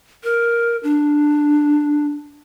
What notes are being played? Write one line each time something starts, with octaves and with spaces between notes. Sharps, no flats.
A#4
D4